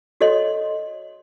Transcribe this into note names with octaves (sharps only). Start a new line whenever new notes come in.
F#4 A4 C#5 D#5 C6